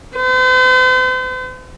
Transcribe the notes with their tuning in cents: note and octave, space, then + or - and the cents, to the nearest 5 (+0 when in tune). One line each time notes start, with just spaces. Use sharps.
C5 -45